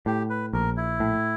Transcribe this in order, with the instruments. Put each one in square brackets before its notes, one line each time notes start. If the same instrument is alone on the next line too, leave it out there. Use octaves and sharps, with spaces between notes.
[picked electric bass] A2 [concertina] G4
[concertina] B4
[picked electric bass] A#1 [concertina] A#4
[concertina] E4
[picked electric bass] A2